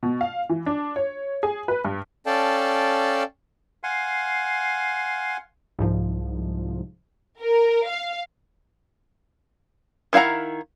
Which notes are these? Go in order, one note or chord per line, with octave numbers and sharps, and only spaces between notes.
B2
F5
E3
D4
C#5
G#4
B4
G2
C#4 A4 D5 F5 G5 A5
F5 F#5 G#5 C6
C2 G#2 F3
A#4
F5
D#3 E4 F5 F#5 A#5